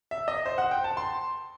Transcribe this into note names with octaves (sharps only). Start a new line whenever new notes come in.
E5
D#5
C5
F#5
G5
A5
C6